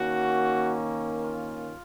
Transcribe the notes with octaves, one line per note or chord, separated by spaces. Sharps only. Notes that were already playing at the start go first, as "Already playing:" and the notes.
Already playing: D#3 A#3 C#4 F#4
F4